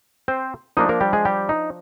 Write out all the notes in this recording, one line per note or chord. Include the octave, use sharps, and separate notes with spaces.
C4 C5
F3 A#3 D4 D#4 D#5
A#3 A#4
G3 G4
G#3 G#4
G3 G4
D#4